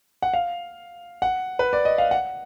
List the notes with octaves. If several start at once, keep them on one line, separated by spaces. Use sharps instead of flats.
F#5
F5
F#5
B4
D5
D#5
F5
F#5